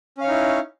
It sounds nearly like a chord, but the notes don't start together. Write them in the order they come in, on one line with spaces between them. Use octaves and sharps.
C#4 F5 C#5 D#4 E4